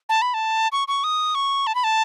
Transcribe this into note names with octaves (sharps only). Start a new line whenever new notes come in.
A5
B5
A5
C#6
C#6
D#6
C#6
A5
B5
A5